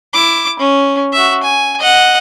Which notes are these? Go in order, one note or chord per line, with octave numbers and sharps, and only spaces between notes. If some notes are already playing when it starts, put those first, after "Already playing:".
E4 D6
C#4
F#4 E5
G#5
D#5 F#5